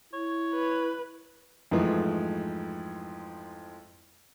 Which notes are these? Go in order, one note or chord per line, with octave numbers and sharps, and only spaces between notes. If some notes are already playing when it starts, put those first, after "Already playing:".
E4 C#5
B4
F2 G#2 E3 F3 G#3 A3